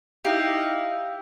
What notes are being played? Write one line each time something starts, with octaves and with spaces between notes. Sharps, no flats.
D#4 E4 G4 F5